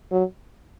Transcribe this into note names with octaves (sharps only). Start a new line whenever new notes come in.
F#3